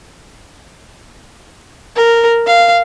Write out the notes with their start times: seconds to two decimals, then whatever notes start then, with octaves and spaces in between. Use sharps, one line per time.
1.96 A#4
2.46 F5